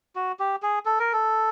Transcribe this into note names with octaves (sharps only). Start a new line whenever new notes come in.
F#4
G4
G#4
A4
A#4
A4